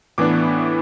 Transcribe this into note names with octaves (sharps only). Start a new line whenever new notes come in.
A2 E3 B3 D4 D6